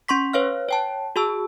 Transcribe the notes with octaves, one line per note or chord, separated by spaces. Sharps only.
C#4 C6 C#6 B6
B4 C#5 F5 F6
C#5 G5 A5
F#4 G#4 A5 E6